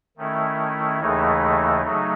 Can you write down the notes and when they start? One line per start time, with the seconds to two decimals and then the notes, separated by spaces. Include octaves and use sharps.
0.17 D#3 A3 C#4 E4
0.99 D#2 C#3 E3 A3 D#4
1.82 C#3 F#3 A3 D#4